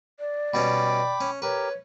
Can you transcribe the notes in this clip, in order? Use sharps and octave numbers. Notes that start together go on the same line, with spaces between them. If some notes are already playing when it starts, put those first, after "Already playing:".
D5
B2 G3 C#4 G5 B5 D6
C#4
G4 A#4 B4 C#5